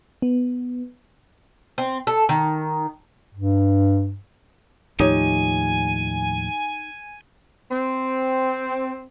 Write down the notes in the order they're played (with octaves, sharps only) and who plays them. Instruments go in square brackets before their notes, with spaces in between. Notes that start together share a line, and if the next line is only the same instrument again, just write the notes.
[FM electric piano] B3
[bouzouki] C4
A4
D#3
[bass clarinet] G2
[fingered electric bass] D#2 A2 F3 [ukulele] D#4 G4 C#5 [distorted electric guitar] G#5
[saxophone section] C4